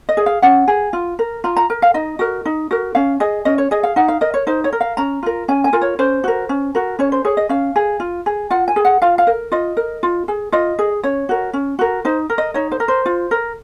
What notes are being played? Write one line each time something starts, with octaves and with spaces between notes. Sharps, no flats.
D#5
G#4
F5
C#4 F#5
G#4
F4
A#4
F4 A#5
A#5
A#4
F5
D#4 D#5
F#4 A#4
D#4
F#4 A#4
C#4 F5
G#4 D#5
C#4 D#5
C#5
G#4 D#5
F5
D#4 F#5
F5
A#4 D#5
C#5
D#4 C5
C#5
A#4
F5
C#4 A#5
F4 A#4
C#4 G#5
G#5
F4 A#4
C#5
C#4 C5
F#4 A#4
C#4
F#4 A#4
C#4 C#5
C5
G#4 C#5
D#5
C#4 F5
G#4
F4
G#4
F4 F#5
G#5
G#4
F#5
F4 F5
F5
A#4
F4 D#5
A#4
F4
G#4
F4 D#5
G#4
C#4 C#5
F#4 A#4
C#4
F#4 A#4
D#4 C5
A#4
D#5
D#4 C#5
C5
A#4
C5
F4
A#4